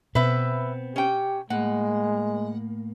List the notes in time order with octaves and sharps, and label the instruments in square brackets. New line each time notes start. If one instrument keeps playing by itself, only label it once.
[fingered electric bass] B2 [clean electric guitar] B3 C4 [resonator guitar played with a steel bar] B4 E5
[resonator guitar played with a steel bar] C#4 G5 [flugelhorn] G4
[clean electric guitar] A2 A#3 [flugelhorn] G#3 [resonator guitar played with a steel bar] F#5